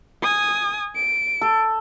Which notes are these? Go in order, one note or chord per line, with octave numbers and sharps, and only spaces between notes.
G#5 D#6
D7
A4